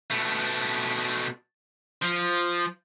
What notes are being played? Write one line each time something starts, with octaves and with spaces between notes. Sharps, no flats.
B2 A3
F3